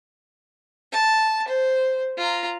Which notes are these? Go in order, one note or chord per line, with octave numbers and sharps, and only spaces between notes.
A5
C5
F4 A#5